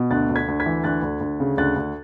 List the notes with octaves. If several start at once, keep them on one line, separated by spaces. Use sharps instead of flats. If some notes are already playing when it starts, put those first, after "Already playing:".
Already playing: B2
D2 F#6 A6
D2
G#6 B6
D2
G#6 B6
E3
D2 F#6 A6
D2
D2
C#3
D2 F#6 A6
D2